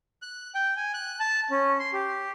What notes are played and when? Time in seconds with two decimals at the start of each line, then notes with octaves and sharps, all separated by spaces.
0.22 F#6
0.55 G5
0.77 G#5
0.94 F#6
1.20 A5
1.50 C#4
1.79 C6
1.93 G4